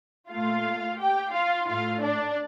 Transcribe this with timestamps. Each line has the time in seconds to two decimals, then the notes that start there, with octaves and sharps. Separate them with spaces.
0.31 A#2 A3 F4 F5
0.99 G4 G5
1.33 F4 F5
1.69 A2 A3 F4 F5
2.02 D4 D5